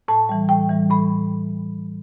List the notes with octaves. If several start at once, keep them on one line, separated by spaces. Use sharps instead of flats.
A2 A5
E3 G3
A2 G5
E3 G3
A2 B5